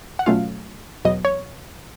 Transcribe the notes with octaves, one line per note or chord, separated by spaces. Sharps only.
F#5
B2 F#3 A3 C#4 F4 F5
E2 B2 F#3 D#5
C#5